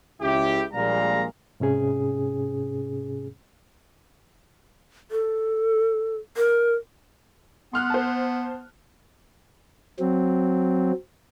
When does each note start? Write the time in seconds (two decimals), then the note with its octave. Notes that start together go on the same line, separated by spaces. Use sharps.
0.21 C#2 E4 G4
0.73 A#1 A#2 G3 G#3 F5 A#5
1.60 G#2 C3 C#4 G#4
5.11 A4
6.37 A#4
7.73 B3 C6 F6 F#6
7.90 C5 A5
9.99 F#3 C4